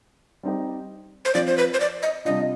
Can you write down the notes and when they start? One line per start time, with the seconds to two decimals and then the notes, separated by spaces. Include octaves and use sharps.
0.43 G3 C4 D#4 G4
1.25 C5
1.35 F3 C4 F4 D5
1.47 C5
1.58 B4
1.74 C5
1.80 D5
2.03 D#5
2.25 C3 G3 D4 F4 D#5